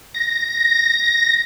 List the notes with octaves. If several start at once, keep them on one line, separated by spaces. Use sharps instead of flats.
A#6